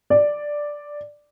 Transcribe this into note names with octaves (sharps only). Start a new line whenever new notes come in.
D5